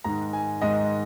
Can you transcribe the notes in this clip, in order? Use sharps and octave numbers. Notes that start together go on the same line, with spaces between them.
G#2 D#3 G#3 A#5
G#5
G#2 D#3 G#3 D#5